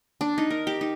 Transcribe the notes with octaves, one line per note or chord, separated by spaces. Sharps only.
D4
D#4
A#4
G4
D#4